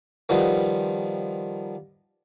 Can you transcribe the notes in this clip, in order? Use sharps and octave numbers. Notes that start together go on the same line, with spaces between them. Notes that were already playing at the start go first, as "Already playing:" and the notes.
D#3 F3 G3 B3